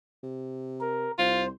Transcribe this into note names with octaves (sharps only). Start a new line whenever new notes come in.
C3
A#4
C2 F4 C5